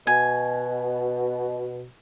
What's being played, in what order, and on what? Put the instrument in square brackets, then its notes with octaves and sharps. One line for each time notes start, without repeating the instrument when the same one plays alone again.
[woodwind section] B2 [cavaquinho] G#5